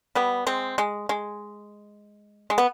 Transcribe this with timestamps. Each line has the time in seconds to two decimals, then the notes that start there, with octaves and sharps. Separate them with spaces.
0.15 G3 B3
0.47 G#3 C4
0.78 G#3
1.09 G#3
2.50 G#3
2.58 B3